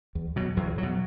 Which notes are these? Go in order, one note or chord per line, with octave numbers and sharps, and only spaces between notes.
E2
B2 F#3
E2
B2 F#3